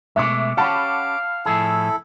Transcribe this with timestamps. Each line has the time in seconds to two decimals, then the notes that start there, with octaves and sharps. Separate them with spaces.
0.16 B2 G#3 A3 E5 D6
0.57 C#4 G4 F5 F#5 A5 B5 D6
1.46 A2 F3 E4 G#4 A4